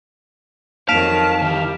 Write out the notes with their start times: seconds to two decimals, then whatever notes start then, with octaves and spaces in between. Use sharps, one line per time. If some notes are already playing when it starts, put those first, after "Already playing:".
0.89 F2 D#3 F#3 F5 A5 B6 D7 E7
1.42 D#3 E3 G3